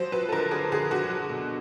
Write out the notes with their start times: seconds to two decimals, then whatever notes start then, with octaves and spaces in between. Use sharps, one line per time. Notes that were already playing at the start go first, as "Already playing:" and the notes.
Already playing: F3 F#3 C5
0.12 F#3 B4
0.28 A4
0.32 D3 A#4
0.51 D3 G#4
0.72 D3 G#4
0.91 D3 F#4
1.10 F#3
1.29 B2